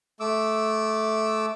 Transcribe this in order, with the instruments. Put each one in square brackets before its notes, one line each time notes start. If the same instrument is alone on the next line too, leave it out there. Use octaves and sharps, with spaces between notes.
[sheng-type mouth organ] A3 D6 E6